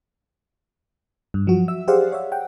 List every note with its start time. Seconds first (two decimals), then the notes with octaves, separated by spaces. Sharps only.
1.34 G2
1.47 F3 F#3 F#4
1.68 E5 E6
1.88 G4 G#4 C5 D5 F5 F#5
2.12 C#5 E5
2.32 F#5 G5